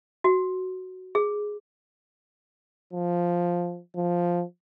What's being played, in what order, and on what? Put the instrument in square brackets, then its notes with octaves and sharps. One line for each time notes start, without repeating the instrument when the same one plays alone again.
[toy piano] F#4
G#4
[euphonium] F3
F3